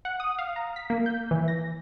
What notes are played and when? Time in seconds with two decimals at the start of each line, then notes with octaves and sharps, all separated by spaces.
0.05 F#5
0.20 D#6
0.39 F5
0.56 A#5
0.76 B6
0.90 A#3
1.06 G6
1.31 E3
1.48 A#6